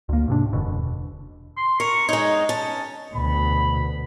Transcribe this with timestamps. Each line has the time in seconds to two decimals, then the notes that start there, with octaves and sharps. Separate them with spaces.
0.09 D2 A#3
0.28 G#2 C3 D4
0.53 E1 F#2 B2 D3
1.57 C6
1.80 A#4 C#6
2.09 G#3 D#4 C#5
2.49 C#4 A5
3.14 D2 B2 B5